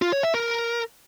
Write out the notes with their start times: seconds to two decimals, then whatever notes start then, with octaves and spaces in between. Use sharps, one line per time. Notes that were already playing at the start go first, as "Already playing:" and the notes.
0.02 F4
0.13 C#5
0.23 E5
0.34 A#4